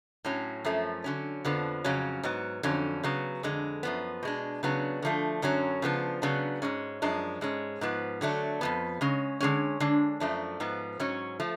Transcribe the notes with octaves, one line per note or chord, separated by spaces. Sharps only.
A2 F#3 C#4
F#2 F3 A3 C#4
D3 F#3 C#4
F2 D3 F3 B3
F2 C#3 F#3 C#4
G#2 F#3 B3
F2 D3 F#3 C#4
C#3 F#3 B3
F2 D3 G#3
F#2 F3 B3
B2 G#3 D4
C#3 F#3 B3 D4
D3 F3 A3
F#2 D3 F#3 C#4
C#3 F3 B3 D4
C#3 F#3 B3 D4
G#2 G#3 C#4
F#2 F3 G#3 D4
G#2 G#3 C#4
G#2 F3 B3
D3 F#3 A3 D4
F2 F3 B3
C#3 G#3 C#4
D3 G#3 C#4
D3 G#3 D4
F#2 F3 A3 D4
G#2 F3 B3
G#2 F#3 C#4
F3 A3